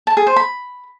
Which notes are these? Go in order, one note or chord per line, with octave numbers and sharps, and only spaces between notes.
A5
G#4
C5
B5